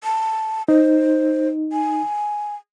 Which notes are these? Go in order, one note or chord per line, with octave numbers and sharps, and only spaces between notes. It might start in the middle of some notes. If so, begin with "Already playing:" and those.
A5
D#4 C5
G#5